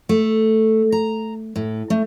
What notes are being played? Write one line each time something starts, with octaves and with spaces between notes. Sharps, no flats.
A3
A#5
A2
A3